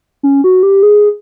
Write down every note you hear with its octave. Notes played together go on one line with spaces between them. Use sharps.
C#4
F#4
G4
G#4